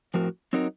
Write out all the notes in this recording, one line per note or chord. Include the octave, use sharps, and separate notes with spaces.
A2 F3 C4 F#4 A#4
F#3 C4 D#4 A#4